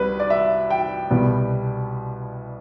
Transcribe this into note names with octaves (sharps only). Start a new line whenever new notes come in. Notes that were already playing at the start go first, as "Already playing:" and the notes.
Already playing: C2 C3 G3 B4
D5
E5
G5
C2 B2 G3 B3